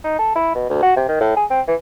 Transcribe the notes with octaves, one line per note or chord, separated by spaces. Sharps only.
D#4
A4
E4
B2
D2
F#4
C3
D#3
A2
G#4
C4
E3